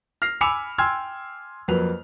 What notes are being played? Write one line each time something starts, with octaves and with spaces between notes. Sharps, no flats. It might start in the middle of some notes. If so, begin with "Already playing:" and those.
F6 A#6 C7 F7
G#5 B5 D6 E6 C#7 F7
G5 G#5 C6 E6 F6 G#6
F2 F#3 A#3 B4 F7